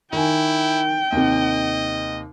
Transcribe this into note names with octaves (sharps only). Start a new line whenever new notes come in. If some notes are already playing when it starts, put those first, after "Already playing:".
D#3 E4 G5 G#5
D#2 C3 D#5